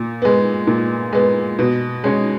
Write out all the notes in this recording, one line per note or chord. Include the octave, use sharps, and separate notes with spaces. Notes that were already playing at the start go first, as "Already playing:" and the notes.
Already playing: A#2
G#3 B3
A#2
G#3 B3
B2
G#3 C#4